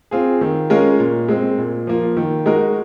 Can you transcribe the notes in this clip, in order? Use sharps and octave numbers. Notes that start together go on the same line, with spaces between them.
C4 F4 G#4
D#3
G#3 C#4 F4 A#4
A#2
G#3 C4
A#2
F3 A#3 F4
D#3
G#3 D#4 F#4 A#4